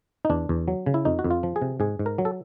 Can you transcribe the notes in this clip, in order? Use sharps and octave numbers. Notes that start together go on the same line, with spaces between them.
D#4
E2 D4
E2
F#3
C#3
E4
F2 D#4
F#4
F2
F4
F3
G#4
C3
G#2 G#4
G#2
A#4
F#3
A4